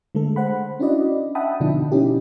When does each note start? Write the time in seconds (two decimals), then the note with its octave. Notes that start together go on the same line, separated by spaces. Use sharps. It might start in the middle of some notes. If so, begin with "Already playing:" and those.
0.15 D3 G#3 A3 A4
0.36 C5 F#5 B5
0.80 C#4 D4 E4 F#4 D5 D#5
1.35 E5 F#5 G5 A5 B5 D#6
1.60 B2 D3 F3 D4 D#4
1.92 C#4 D#4 E4 G4